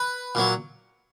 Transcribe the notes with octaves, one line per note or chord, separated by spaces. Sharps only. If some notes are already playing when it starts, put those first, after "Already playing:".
Already playing: B4
A#2 F#3